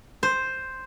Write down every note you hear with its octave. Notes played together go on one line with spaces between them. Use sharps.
C5